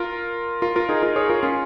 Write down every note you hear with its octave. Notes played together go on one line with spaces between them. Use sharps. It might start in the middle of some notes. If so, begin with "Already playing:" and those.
Already playing: F4 A#4
F4 A#4
F4 A#4
D#4 G#4
F4 A#4
G#4 C#5
F4 A#4
C#4 F4